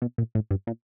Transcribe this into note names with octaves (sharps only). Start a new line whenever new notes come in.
B2
A#2
A2
G2
A#2